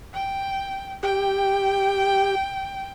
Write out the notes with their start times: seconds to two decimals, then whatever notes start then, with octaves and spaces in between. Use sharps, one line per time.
0.14 G5
1.03 G4 G5